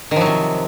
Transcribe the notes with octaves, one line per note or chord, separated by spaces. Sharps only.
C3 D#3 F3 F#3